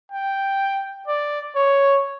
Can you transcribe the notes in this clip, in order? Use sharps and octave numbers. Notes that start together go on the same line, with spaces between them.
G5
D5
C#5